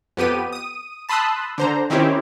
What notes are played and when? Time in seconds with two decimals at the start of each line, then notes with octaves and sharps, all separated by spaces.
0.17 F2 B3 G4 D#7
0.52 D#6 D#7
1.09 A5 B5 C6 D#6 E6 F#6
1.58 D3 C5 A#5
1.90 D#3 C4 C#4 E4 G4